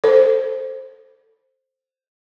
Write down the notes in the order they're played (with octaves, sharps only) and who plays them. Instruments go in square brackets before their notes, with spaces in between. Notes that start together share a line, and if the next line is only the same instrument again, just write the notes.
[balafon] A4 C5